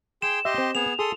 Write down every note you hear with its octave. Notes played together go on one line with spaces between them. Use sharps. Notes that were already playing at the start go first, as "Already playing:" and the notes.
G#4 G5 C6 E7
G4 D#5 E5 C6
C4
B3 G#4 F7
G#4 A4 C6 D#6